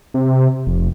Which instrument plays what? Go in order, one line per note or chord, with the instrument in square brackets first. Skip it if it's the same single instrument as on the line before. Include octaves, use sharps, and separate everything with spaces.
[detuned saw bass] C3
F1